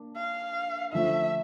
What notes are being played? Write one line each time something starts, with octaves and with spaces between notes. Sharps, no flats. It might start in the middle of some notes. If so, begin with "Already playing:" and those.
Already playing: A#3 D4
F5
D3 F3 A3 E5